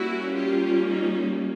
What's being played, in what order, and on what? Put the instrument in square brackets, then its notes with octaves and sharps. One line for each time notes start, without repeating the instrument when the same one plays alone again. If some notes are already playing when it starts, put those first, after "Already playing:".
Already playing: [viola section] G3 A#3 C#4 E4 F#4
F4 G4
D#4 F4